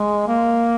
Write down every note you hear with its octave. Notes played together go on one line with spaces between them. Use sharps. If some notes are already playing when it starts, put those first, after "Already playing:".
Already playing: G#3
A#3